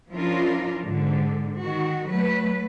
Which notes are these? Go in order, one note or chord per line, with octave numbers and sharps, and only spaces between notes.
F3 C#4 D4 E4 F4 A#4
G#2 D3
D#3 F#4
F#3 A3 B4